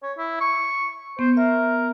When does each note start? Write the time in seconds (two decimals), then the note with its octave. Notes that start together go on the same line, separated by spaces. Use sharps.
0.03 C#5
0.18 E4
0.41 C#6
1.19 B3 C5
1.37 A#4 E5